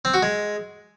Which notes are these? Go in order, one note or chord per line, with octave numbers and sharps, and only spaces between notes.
C4
F#4
G#3